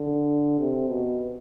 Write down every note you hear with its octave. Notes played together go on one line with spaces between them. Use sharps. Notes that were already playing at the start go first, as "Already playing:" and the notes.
Already playing: D3
C3
B2